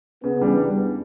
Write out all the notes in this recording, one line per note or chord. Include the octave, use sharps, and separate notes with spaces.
C#3 B3
E3 G3 D4